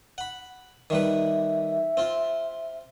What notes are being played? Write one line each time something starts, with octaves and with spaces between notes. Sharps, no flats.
F#5 B5
D#3 G3 B4 E5
C4 F4